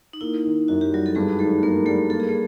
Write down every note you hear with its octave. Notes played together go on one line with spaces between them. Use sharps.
D#4
A#3 E4
D#3
F#2 F#4
G4
F#3 G3 F#4
A4
G2 G#3 G#4
D#3 A3 A4
G2 A#3 A#4
G3 A3 A4
A#3 A4
G#4
A3 A4